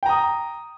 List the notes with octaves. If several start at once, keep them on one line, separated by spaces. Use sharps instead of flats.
G5 A#5 D#6